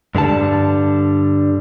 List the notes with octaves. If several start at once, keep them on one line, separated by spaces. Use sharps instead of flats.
G2 D3 G3 A5